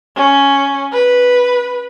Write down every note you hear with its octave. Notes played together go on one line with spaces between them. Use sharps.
C#4
B4